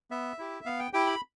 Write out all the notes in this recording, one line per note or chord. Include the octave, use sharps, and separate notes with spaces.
B3 E5
E4 G4
B3 F5
G5
E4 G4 G5
B5